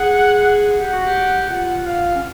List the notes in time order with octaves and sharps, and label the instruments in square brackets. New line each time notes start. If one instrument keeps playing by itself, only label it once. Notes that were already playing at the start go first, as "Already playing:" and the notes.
Already playing: [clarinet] G#4 [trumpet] F#5
[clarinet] G4 [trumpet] F#5
[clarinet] F#4
G4
[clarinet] F4 [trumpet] F#5
[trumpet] F5
[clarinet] C#4